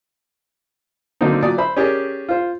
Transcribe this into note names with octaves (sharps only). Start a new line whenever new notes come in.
D3 F#3 A#3 C4 D#4
A#2 F#3 D5 D#6
C5 E5 B5
C#4 G4 G#4 A#4 C#5 D5
F4 C5